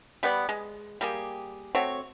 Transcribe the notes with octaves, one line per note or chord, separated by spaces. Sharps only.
G3 B3 C#5 D5
G#3
G3 A#3 G4 G#4
A3 C4 F#4 C#5